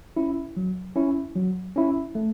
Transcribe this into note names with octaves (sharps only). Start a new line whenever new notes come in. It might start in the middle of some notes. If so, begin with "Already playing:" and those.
C#4 E4
F#3
C#4 E4
F#3
C#4 E4
A3